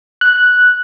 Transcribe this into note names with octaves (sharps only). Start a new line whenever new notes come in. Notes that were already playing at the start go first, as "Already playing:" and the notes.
F#6